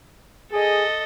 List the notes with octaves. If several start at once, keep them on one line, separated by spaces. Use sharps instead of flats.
G#4 A4 D#5